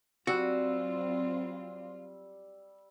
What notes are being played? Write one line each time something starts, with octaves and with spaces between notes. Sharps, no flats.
F#3 G3 C4 F4 F#4 E6